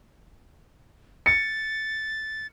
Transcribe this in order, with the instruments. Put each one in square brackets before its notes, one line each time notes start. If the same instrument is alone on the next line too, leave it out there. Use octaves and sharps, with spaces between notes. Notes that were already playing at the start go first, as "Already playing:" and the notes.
[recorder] A6 [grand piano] C#7